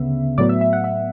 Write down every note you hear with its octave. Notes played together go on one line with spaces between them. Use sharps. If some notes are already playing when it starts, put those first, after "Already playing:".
Already playing: D2 C#3 B3 E5
A2 F#3 B3 D5
E5
E5
F#5
E5